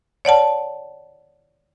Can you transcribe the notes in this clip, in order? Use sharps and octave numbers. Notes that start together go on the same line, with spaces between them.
C#5 D5 F#5 A5